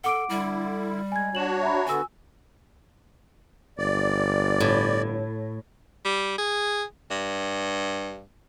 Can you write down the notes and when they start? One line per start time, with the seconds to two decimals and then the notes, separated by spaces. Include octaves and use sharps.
0.04 A4 F#5 D6 D7
0.29 D3 G3 E4
1.12 G#3 G#5 G#6
1.35 D4 F#4 C#5 E7 F#7
1.62 E5 A#5 B5
1.87 D3 B3 F#4 G#5 E6
3.78 G1 D5
4.60 A2
6.05 G3
6.38 G#4
7.11 G2